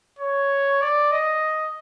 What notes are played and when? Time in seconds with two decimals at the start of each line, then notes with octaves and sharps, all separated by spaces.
0.19 C#5
0.82 D5
1.12 D#5